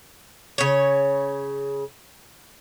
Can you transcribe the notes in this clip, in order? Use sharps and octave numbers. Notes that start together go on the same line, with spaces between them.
C#3 C#5